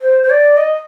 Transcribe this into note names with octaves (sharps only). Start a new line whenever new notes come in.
C5
C5
D5
D#5